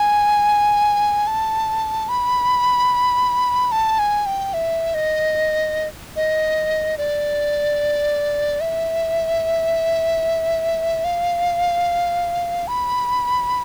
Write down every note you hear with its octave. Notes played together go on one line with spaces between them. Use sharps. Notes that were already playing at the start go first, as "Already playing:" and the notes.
Already playing: G#5
A5
B5
A5
G#5
G5
E5
D#5
D#5
D5
E5
F5
B5